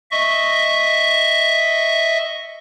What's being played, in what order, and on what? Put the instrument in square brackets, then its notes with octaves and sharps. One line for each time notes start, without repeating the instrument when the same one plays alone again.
[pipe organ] D#5 E5 C#6